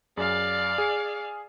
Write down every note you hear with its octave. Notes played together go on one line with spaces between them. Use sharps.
F#2 G#4 D5 F5
G#4